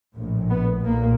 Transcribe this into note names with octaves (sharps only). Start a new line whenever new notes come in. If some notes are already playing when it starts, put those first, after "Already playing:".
A#1 A2
B3
B1 A#2 A#3